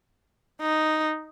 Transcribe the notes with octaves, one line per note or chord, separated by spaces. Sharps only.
D#4